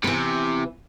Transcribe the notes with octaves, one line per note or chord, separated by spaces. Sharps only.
C3 E3 B3